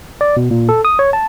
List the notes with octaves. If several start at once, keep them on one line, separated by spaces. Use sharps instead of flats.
D5
B2
A#2
A4
D#6
C#5
A5